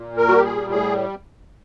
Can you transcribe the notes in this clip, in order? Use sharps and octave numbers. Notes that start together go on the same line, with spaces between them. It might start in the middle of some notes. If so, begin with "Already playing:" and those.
Already playing: A#2
A#4
G3 F#4
G4
G#4
A2 G#4